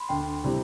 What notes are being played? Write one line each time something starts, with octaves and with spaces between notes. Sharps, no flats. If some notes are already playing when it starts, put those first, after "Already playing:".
Already playing: B5 C6
D2 G5
C3 G3 C4 E4